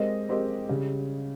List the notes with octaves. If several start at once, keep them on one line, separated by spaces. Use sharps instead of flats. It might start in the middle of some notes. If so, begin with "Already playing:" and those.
Already playing: G#3 C4 G4 A#4 D#5
G#3 C4 G4 A#4 D#5
C#3 G3 C#4